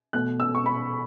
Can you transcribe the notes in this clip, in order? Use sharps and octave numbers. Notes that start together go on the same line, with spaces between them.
B2 A3 F#6
E6
C#6
B5